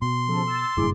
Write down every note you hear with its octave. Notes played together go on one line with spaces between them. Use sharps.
B2 C6
C#3 F3 A4
E6 A6
F#1 G2 A#2 E4 G#4 D6